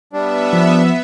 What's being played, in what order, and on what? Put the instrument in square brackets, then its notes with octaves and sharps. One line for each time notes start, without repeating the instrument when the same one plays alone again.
[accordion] G3 D4 [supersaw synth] B3 E5
[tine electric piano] F3